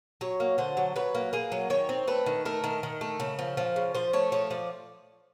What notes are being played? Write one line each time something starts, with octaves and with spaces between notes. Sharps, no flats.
F#3 C#5
A#3
D3 C5
F#3
F#3 B4
A#3
A#3 G#4
F#3
D#3 C#5
C4
A3 B4
D#3
A3 A#4
D#3
D#3
A3
C#3
F3
F3
C#3
F3 C5
A3 C#5
F3 C#5
F3 D5